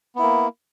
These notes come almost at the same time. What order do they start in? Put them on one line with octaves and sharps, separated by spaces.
B3 E4 A#3